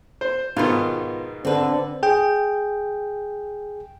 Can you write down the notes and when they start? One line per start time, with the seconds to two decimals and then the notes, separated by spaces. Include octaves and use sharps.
0.21 C5
0.56 G#2 B2 D#3 B3 F4
1.45 D3 C4 B4
2.03 G#4 G5